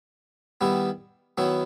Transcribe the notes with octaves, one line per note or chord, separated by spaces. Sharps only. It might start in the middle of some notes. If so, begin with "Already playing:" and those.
D#3 G3 B3 E4
D#3 F#3 B3 E4